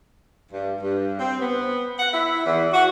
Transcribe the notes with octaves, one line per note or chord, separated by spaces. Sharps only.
G2
G2
C4
B3
F#5
E4
E2
F#4